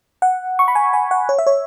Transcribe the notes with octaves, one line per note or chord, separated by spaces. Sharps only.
F#5
C#6
B5
G#5
G#5
F#5
C#5
E5
C#5